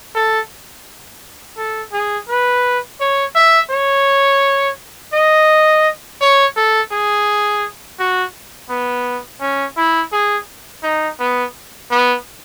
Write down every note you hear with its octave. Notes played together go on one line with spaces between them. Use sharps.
A4
A4
G#4
B4
C#5
E5
C#5
D#5
C#5
A4
G#4
F#4
B3
C#4
E4
G#4
D#4
B3
B3